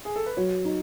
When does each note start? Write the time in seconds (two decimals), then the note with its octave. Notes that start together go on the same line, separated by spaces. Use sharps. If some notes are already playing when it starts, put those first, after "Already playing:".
0.05 G#4
0.16 A4
0.26 B4
0.37 F#3 C#5
0.65 D#4